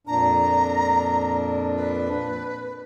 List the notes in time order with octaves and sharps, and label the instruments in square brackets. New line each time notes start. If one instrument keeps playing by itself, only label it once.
[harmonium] F2 A#2 D4 [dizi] A#5
[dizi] B4